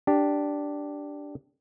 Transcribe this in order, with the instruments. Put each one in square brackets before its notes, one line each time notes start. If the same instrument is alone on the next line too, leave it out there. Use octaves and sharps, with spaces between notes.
[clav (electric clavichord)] D4 G4